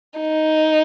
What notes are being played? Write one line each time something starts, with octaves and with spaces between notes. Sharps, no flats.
D#4